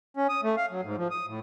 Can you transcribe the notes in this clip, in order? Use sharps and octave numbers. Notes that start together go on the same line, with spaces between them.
C#4
D#6
A3
F5
F#3
G#2
F3
D#6
A2